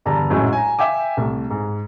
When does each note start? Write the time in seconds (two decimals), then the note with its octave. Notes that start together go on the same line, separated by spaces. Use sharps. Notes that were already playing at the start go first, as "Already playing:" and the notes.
0.05 E2 G2 D3 A5 A#5
0.30 A#1 F#2 A2 F#3 G#3
0.53 G#5 A#5
0.79 E5 G5 G#5 D6
1.17 C2 A3
1.50 G#2